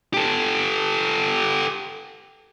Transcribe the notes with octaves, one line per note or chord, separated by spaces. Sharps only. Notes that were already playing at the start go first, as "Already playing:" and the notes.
G4 A4